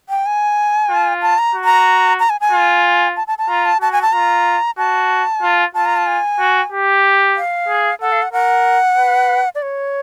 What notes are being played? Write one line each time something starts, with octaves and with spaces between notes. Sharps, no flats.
G5
G#5
F4
A5
A#5
F#4
A#5
A#5
G#5
G#5
F4
A5
A5
A5
F4 A#5
A5
F#4 A5
G#5
A5
F4 A#5
F#4 A5
F4
F4 A5
A#5
A5
G#5
F#4
G4
F5
G#4
A4 F#5
F5
F#5
A#4 F#5
B4
D5
C#5